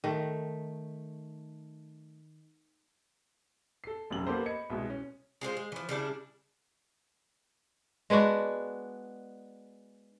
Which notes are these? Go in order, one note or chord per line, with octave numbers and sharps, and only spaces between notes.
D#3 A3
A4 C7
F1 B1 F#2 F#7
A#3 B3 G4 A4 C5 A#5
D#5 B5 G#6 C#7
C2 B2 G#3
C#4
G#3 F4 G#4 C5
G#3
E3 F3
C#3 G3 D4 E4
G#3 B3 D4 F#4